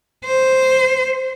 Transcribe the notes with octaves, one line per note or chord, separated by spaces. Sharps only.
C5